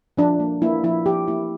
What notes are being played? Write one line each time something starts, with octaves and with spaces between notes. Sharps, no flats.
F3 D4
A#3
A#3 E4
F3 E4
F3 G4
A#3 E4